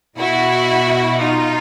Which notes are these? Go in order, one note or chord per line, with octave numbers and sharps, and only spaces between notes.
B2 E4 F#4
D#4 F4